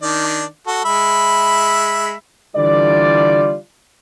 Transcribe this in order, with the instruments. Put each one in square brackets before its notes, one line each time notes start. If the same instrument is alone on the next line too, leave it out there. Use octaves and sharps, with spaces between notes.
[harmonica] D#3 D4 D5
F#4 A4
G#3 E5 B5
[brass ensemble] D3 E3 G3 F4 D5